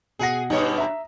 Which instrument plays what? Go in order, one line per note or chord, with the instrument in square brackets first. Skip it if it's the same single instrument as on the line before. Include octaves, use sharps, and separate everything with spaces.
[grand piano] B2 F#5 A#6 [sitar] G#4
[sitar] G2 B2 C#5 [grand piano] D#4 D#5
[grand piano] E5 A#5